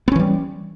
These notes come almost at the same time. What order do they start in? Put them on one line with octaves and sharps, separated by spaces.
B3 C#4 E3 G3